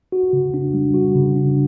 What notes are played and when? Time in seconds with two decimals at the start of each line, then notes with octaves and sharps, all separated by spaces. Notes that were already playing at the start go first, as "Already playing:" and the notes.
0.12 F#4
0.33 C#3
0.54 D4
0.74 G3
0.94 F#4
1.15 C#3
1.36 D4